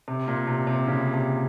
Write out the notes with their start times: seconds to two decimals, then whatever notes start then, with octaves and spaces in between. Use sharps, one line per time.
0.08 C3
0.27 A#2
0.47 C3
0.67 C3
0.87 A#2 C#3
1.14 C3